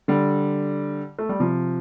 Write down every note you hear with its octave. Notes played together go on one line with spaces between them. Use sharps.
D3 G3
A3
G3
C3 F3